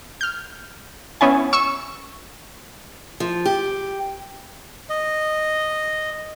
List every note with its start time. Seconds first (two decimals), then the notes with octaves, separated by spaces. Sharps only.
0.21 F6 G6
1.21 B3 C#4 E4 G#5
1.53 C#6 E6
3.20 F3
3.45 G4
4.90 D#5